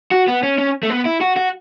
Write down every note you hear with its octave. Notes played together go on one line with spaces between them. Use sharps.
F#4
B3
C#4
C#4
A3
B3
E4
F#4
F#4